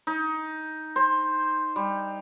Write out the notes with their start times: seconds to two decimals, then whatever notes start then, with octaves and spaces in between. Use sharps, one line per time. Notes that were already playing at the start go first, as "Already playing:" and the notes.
0.07 D#4
0.96 C5
1.76 G3